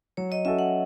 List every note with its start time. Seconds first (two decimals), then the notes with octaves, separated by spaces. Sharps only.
0.17 F#3 C#5
0.32 D#5
0.45 C#4 F#4 A4 E5
0.59 F#5